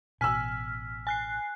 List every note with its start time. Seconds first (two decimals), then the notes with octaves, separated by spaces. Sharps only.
0.21 A1 B2 G#5 E6 F6 B6
1.07 G#5 F#6 C7